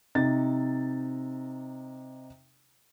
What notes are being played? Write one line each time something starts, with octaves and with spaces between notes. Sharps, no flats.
C3 D#4 A6